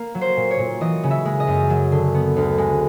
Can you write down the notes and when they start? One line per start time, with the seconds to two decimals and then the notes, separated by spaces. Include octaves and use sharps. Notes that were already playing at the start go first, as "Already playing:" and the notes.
Already playing: A#3
0.15 F#3
0.21 C5
0.36 A#2
0.51 C#5
0.59 A#2
0.81 E3 D#5
1.03 C#3
1.11 E5
1.25 G#3
1.40 D#5
1.47 F#2
1.70 F#3
1.92 D3
2.15 B3
2.36 D2
2.58 G#3